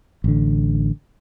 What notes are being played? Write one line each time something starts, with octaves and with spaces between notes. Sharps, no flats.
A1 D3